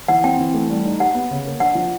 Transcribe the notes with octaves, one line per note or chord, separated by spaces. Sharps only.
E3 F#5
C4 G5
E3
A3
G3
D#4
G4 F#5
B3
C#3
A#3
D4 F#5
F3